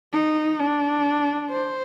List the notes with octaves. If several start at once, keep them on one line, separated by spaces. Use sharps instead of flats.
D#4
D4
C5